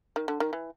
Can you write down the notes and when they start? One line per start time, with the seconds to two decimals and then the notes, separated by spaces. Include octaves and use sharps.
0.16 D#3
0.28 D3
0.40 D#3
0.53 E3